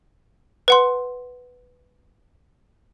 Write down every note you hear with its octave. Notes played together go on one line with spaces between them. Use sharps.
B4 F#5 C6